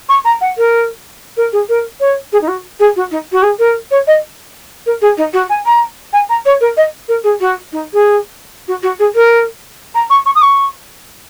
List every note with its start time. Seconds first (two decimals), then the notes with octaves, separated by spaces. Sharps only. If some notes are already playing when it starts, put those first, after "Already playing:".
0.09 C#6
0.24 A#5
0.40 F#5
0.57 A#4
1.36 A#4
1.52 G#4
1.68 A#4
2.00 C#5
2.32 G#4
2.41 D#4
2.47 F#4
2.79 G#4
2.95 F#4
3.11 D#4
3.32 F#4
3.42 G#4
3.58 A#4
3.90 C#5
4.07 D#5
4.86 A#4
5.01 G#4
5.17 D#4
5.33 F#4
5.49 G#5
5.65 A#5
6.12 G#5
6.29 A#5
6.45 C#5
6.60 A#4
6.76 D#5
7.08 A#4
7.23 G#4
7.40 F#4
7.72 D#4
7.93 G#4
8.67 F#4
8.82 F#4
8.99 G#4
9.15 A#4
9.94 A#5
10.09 C#6
10.25 C#6
10.35 D#6
10.41 C#6